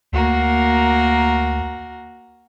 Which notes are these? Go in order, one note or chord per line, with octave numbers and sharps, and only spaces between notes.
D2 A#3 F#4 A#4